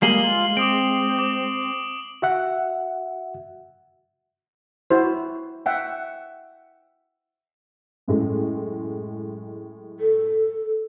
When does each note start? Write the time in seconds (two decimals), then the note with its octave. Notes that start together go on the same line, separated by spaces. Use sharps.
0.02 G3 G#3 A#3 G#4 C7 F#7 G7
0.24 F4
0.57 C4 D6 D#6 D7
1.19 D6
2.22 F#4 E5 F#5
4.91 E4 F#4 C5
5.66 E5 F#5 G5
8.08 F#2 A2 G#3
10.00 A4